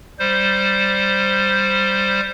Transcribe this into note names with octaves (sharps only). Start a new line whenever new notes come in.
G3 C5